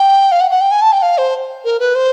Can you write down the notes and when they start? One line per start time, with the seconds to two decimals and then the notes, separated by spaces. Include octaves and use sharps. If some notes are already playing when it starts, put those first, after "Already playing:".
Already playing: G5
0.32 F5
0.41 F#5
0.51 F#5
0.61 G5
0.71 G#5
0.82 A5
0.92 G5
1.02 F5
1.18 C5
1.65 A#4
1.80 B4
1.95 C5